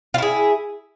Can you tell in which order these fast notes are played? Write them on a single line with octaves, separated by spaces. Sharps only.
F4 E4 G#4